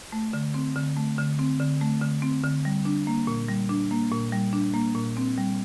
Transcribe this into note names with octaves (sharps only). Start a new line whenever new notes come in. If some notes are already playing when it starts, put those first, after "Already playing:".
A3
D3
C4
D3
A3
D3
C4
D3
A3
D3
C4
D3
G3
D4
A#3
A#2
G3
D4
A#3
A#2
G3
D4
A#3
A#2
C4
G3